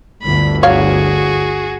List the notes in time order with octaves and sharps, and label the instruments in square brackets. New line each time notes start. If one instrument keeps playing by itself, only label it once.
[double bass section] G1 D2 D3 [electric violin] B5
[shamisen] F#3 C#5 F5 [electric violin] F#4 G#4